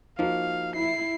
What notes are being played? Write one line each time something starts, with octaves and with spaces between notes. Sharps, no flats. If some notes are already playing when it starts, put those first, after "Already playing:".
F3 A#3 D#4 F#4 F5
E4 C7